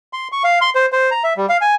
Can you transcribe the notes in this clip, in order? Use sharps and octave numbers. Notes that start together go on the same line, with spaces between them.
C6
C#6
F5
C6
C5
C5
A#5
E5
G3
F5
G#5